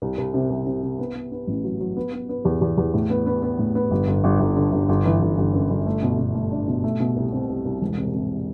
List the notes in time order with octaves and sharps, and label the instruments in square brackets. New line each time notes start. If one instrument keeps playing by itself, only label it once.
[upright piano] C2
C2
C3
C2
C3
C3
B3
B3
B3
A1
F#3
F#3
B3
B3
B3
E2
E2
E2
A2
B3
B3
B3
A2
B3
G1
G1
G1
G1
D3
G1
G1
E3
G1
G1
F#2
G1
A3
B2
B2
A3
D4
B2
A3
B2
C2
C4
C2
C2
E1
C3
C3